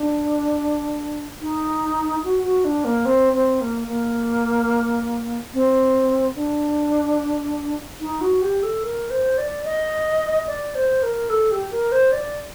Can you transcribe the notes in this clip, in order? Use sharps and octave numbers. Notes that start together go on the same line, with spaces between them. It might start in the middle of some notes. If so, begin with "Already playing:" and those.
Already playing: D4
D#4
F#4
F#4
D4
A#3
C4
C4
A#3
A#3
C4
D4
D#4
F#4
G4
A4
A#4
C5
D5
D#5
D5
C5
A#4
A4
G4
A#4
C5
D5